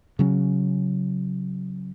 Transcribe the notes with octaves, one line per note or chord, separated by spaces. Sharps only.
C#3 F#3 C#4